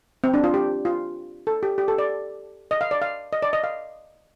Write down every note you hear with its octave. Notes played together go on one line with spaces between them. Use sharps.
C4
D4
F4
G4
F4
A4
G4
G4
A4
D5
D#5
F5
D5
F5
D#5
D5
D#5
F5